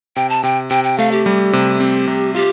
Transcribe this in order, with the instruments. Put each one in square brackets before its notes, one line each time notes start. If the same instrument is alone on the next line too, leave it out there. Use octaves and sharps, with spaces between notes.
[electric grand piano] C3 [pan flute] G5
[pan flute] A5
[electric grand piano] C3 [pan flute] G5
[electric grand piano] C3 [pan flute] G5
[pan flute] G5
[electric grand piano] A3 [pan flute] F5
[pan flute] G4
[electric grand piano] G3
C3
C4
C3
[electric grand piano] F4 [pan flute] G4